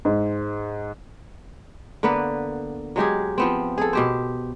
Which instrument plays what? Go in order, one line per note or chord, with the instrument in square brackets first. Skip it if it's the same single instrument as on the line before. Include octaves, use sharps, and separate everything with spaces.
[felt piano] G#2
[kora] D3 A#3 B3 B4
F#3 G#3 G4 G#4
F3 B3 C4
G#4 A4
B2 G4 C5